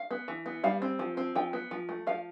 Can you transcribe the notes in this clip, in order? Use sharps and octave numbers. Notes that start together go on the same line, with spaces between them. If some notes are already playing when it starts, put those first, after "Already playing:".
Already playing: F5
B3
E3
B3
G3 F5
C4
F3
C4
F3 G5
B3
F3
A3
F3 F5